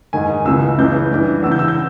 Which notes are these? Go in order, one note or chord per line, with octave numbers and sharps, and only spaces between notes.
G#2 D#3 G#5
C#2 C#3 E3 E6
C#2 C#3 E3 G6
G2 E3
E2 C#3 E3 E6
G6
E6
G6